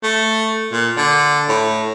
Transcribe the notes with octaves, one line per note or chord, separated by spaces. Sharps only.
A3
A#2
D3
A2